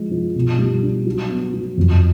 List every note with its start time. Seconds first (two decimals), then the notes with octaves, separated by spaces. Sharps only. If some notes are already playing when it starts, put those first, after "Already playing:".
Already playing: F3 G#3
0.11 F3
0.35 B2
0.59 G3
0.83 D4
1.06 F#3
1.29 B3
1.53 F#3
1.77 F2